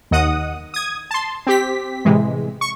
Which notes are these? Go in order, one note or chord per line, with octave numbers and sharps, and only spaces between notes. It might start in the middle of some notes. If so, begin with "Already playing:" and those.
D#2 D#3 D#5 F#5 D#6
D#6 G#6
A5 C6
C4 G4 B6
A2 C3 E3 G#3
C#6